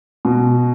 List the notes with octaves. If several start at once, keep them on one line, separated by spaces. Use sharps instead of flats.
B2